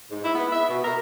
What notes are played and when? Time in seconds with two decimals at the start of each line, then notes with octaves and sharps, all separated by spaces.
0.09 G#2
0.22 E4
0.35 B3
0.52 E5
0.69 B2
0.83 A#4